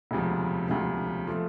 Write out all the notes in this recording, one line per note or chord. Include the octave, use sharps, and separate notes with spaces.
E1 D2 C3 F3
E1 D2 C3 F3
F3 A3